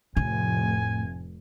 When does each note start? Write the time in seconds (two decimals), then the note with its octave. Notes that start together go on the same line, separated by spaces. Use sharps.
0.17 F1 A2 G#5